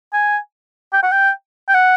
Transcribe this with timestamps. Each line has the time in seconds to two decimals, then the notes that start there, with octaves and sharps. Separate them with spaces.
0.13 G#5
0.93 G5
1.03 F#5
1.12 G5
1.69 G5
1.74 F#5